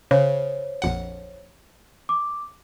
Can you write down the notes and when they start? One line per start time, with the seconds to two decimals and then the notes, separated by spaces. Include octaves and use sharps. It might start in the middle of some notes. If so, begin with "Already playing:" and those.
0.11 C#3 C5 C#5
0.82 A#1 F2 F#5
2.09 D6